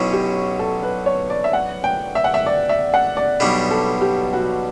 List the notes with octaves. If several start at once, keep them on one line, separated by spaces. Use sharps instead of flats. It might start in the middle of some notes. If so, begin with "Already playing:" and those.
Already playing: B1 B2 F#3 C#4 E4
G4
A4
B4
C#5
D5
E5
F#5
G5
E5
F#5
E5
D5
E5
F#5
D5
B1 B2 G3 D4
A4
G4
F#4